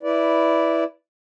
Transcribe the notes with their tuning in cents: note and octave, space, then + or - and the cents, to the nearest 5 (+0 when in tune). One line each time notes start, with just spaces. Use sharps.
E4 +0 B4 +0 D5 -10